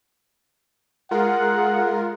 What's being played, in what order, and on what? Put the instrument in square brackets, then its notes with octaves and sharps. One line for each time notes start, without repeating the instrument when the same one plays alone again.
[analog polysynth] G#3 F4 A#4 [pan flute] G#4 [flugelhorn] F#5